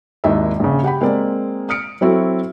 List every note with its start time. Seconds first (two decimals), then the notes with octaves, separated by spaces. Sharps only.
0.24 G#1 D#2 E4 D#5 E5
0.60 A#1 C#3
0.83 G4 F#5 G5 B5
1.01 G#3 A#3 C4 D5
1.69 D#6 F6 C#7 D7
2.01 F#3 C4 E4 F#4 A4